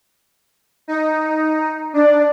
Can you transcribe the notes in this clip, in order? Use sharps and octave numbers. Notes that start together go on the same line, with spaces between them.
D#4
D4 D5